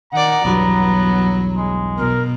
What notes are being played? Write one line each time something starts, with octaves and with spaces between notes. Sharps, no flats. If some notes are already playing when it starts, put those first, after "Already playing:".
D#3 D5 F#5 A#5
B1 E2 G2 F#3 B3
G#3
B2 A#4